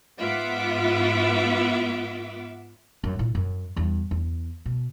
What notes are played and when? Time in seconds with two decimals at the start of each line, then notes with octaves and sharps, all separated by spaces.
0.19 G#2 B3 F4 E5 F#5 D6
3.04 F#2
3.19 A#2 E4
3.35 F#2
3.76 E2 G2
4.11 E2
4.66 B2